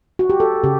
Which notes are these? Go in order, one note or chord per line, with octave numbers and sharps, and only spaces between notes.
F#4
G4
A4
C#3 G4